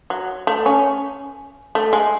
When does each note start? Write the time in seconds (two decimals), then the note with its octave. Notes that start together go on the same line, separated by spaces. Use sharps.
0.10 F#3
0.47 A3
0.66 C#4
1.75 A3
1.93 G#3